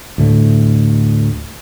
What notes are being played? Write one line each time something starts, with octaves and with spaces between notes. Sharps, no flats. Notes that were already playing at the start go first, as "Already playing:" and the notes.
D2 A2 A3